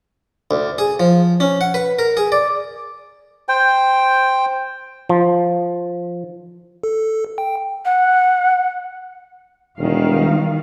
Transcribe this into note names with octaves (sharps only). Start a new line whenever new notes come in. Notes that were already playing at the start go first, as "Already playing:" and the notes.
D2
G#4
F3
C#4
F#5
B4
A#4
G#4
D5
C5 G5
F3
A4
G5
F#5
E1 D#3 G3 F5